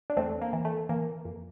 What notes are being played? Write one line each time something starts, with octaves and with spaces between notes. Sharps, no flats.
D4
E2 A3 C4
A#3
E3
A3
E3 A#3
F2